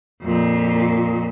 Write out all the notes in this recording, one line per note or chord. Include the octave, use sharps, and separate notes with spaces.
F2 A#2